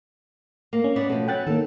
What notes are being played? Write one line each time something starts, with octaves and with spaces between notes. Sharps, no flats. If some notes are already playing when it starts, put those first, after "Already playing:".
A#3
C#4
B3 C#5 D5
B2 F3 A3
F#3 B3 C#4 G5 F#6 A6
D#3 A#3 A4